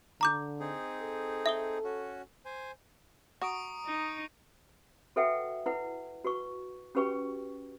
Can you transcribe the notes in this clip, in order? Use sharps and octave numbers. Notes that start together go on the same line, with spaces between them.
D3 A#5 D6 G6
C4 D#4 G#4
A4
E5 D#6 G7
C#4 F#4
C5 G#5
F#4 A#5 C#6 D#6 D7
D#4
F#4 A4 B4 E5 F#5 G5
E4 B4 F#5
F#4 B4 C#6
C#4 F#4 G4 B4 G5 C#6